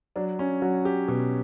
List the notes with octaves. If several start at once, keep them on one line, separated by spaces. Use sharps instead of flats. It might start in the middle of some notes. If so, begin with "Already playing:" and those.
F#3 D4
C#4
F#3 F#4
G4
B2 G4